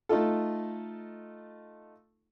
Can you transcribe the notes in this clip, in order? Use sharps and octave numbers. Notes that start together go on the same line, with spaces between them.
A3 D#4 F4 A4